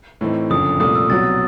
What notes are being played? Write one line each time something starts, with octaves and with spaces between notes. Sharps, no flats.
A2 E3 A3 C4 D#4
F#1 F2 D3 D#6
C2 A#2 F3 A3 D#6
E6
C2 B2 F#3 A6